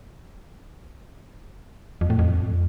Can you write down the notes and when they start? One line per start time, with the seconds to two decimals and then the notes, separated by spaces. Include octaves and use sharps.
2.01 F2
2.10 A2
2.19 F2